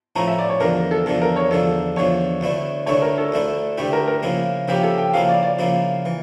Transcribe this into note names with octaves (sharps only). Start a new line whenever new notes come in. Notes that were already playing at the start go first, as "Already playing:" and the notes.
A2 F3 C#4 E4 A#5
E5
D5
C#5
E2 D3 F3 A#4
A4
E2 D3 F3 A4
A#4
C#5
E2 D3 F3 A4
E2 D3 F3 C#5
D2 D3 A3 E4
D2 D3 A3 E4 C#5
A#4
A4
D2 D3 A3 E4
D2 D3 A3 E4 G4
A#4
A#4
C#3 F3 A#3 E4
C#3 F3 A#3 E4 G4
A4
G5
C#3 F3 A#3 E4 F5
D5
D5
C#3 F3 A#3 E4
E3